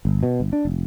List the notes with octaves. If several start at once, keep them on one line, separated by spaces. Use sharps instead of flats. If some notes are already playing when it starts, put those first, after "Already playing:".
G1
B2
G1
D4
F1